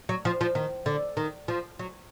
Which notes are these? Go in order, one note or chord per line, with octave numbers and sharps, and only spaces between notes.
F#3
F3
F3
D#3
D3
D#3
F3
F#3